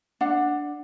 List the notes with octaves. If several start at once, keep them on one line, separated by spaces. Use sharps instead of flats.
D4 F#5